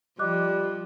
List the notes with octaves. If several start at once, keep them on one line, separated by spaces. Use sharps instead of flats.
F3 G3 D#5 D6 F#6